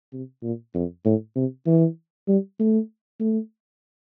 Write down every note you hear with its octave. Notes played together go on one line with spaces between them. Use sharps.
C3
A#2
F2
A2
C3
E3
G3
A3
A3